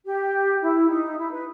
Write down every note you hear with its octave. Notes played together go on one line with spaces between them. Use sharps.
G4
E4
D#4
E4
B4